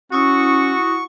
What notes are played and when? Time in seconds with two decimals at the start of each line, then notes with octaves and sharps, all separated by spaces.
0.12 C#4 E4 F#4 C#6 D#6